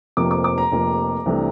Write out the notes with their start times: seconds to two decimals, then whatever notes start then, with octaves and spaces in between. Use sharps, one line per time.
0.17 F1 F2 C3 F3 A#3 D6
0.31 D6
0.44 D6
0.58 A#5
0.72 F1 F2 C3 F3 A#3
1.26 C2 C3 E3 A3 D4